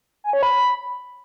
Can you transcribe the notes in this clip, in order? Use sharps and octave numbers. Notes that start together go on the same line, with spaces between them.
G#5
C#5
B5